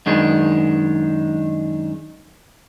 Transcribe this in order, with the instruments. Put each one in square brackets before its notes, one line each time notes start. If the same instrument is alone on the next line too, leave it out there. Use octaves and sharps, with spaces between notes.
[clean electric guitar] F#2 D#3 G#3 D4